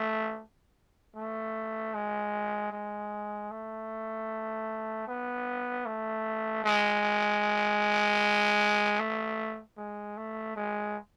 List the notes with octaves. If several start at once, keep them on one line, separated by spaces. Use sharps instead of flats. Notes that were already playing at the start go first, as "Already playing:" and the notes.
Already playing: A3
A3
G#3
G#3
A3
B3
A3
G#3
A3
G#3
A3
G#3